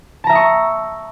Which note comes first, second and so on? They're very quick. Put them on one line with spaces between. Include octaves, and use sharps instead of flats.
A5 A#5 E5 D#6 C#6